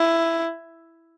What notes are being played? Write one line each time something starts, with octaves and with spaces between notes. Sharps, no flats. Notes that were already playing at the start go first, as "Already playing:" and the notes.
Already playing: E4